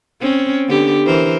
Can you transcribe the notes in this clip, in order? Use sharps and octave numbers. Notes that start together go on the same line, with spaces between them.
C4 C#4
D3 B3 G4
E3 A#4 C5